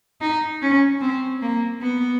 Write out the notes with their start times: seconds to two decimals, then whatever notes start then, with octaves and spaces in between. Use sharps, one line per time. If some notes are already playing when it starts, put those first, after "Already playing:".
0.21 D#4
0.62 C#4
1.01 C4
1.42 A#3
1.81 B3